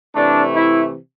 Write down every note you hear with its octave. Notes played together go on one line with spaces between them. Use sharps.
C3 E3 A3 D4
E4